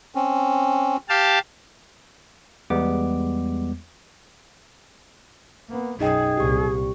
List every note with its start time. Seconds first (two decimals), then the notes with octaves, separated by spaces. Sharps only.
0.15 C4 C#4
1.09 G4 F5 A5
2.70 E2 G3 G#3 B3 D6
5.70 A#3 B3
6.00 B1 F#2 D#4 G#4 D#5 G5
6.37 C2 A#2 G4 C#6